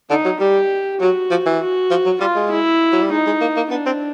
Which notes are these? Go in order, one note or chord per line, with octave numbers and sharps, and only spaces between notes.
D3 D#4
F#3
G3 G4
F#3 F#4
F3
E3
F#4
F3
F#3
G3 F4
G#3
E4
F#3
G3
G#3 D#4
G#3
A#3
A#3
B3 D4
C4